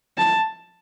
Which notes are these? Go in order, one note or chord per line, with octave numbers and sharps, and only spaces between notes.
A5